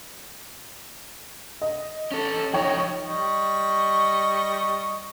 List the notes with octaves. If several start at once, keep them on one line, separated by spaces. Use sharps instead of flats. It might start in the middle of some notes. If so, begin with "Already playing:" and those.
D#5
C#4 A4
F3 D#4 C#5 G5
G3 D#5 C#6